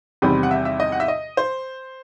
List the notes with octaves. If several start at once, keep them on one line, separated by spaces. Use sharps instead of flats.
E2 C3 D#3 G3 C4 B5
F#5
E5
E5
D#5
F#5
E5
D#5
C5